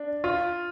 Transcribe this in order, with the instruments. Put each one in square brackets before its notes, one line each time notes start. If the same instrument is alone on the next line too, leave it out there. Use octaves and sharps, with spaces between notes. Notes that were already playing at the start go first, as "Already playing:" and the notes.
Already playing: [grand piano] D4
F4